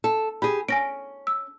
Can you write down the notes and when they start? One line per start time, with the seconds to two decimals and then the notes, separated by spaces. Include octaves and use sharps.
0.04 A4
0.42 G4 G#4 B5
0.69 C#4 G#5 A#6 D7
1.27 E6